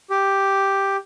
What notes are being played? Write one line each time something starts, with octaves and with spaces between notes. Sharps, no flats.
G4